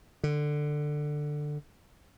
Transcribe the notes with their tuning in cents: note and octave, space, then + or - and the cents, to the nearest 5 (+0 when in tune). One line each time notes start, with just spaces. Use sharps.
D3 +15